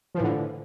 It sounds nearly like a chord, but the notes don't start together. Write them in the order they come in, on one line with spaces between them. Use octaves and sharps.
F3 E3 A2 D3